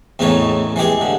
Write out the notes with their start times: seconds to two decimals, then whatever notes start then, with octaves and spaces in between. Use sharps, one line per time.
0.19 E2 A2 C#3 E3 D#4 C#5
0.76 E3 G#3 G4 G#4
1.01 D3